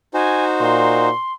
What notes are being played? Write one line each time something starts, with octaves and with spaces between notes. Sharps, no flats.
D#4 F#4 C5 G#5
A#2 C6